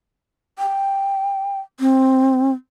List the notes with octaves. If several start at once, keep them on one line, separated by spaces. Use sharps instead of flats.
G5
C4